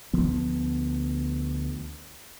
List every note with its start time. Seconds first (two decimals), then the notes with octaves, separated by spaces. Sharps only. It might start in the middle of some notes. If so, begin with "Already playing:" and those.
0.13 D2 F3 B3